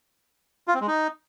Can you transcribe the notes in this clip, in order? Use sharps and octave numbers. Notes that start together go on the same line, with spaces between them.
F4
C4
G#3
D#4